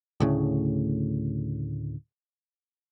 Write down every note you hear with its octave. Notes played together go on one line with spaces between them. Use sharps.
D2 A2 C#3